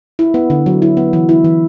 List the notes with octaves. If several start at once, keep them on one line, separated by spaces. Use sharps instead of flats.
E4
B3
D3
F#3
E4
B3
E3
E4
E3